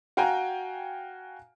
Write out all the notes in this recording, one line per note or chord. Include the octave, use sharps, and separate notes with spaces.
F#4 F5 G5 G#5 A#5